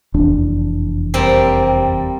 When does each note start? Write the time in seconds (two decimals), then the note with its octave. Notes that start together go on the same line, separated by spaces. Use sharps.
0.14 F1 E2 D4
1.14 G3 A#3 C4